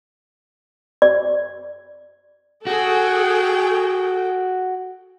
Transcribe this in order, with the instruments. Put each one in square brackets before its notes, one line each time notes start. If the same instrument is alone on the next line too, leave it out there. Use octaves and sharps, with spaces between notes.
[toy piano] D5
[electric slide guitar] F#4 [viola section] G#4 A4 G5